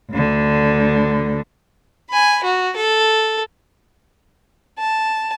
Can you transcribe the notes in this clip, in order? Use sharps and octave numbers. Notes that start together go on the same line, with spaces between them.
D2 D3
G#5 B5
F#4
A4
A5